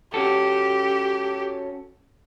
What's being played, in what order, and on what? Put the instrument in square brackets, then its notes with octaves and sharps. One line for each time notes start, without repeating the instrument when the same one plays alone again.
[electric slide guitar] C#4 F#4 A4 [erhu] G4